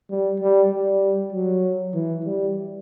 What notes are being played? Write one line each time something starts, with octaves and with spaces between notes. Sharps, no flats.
G3
G3
G3
F#3
E3
G3